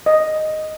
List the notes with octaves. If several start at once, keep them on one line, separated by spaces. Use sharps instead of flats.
D#5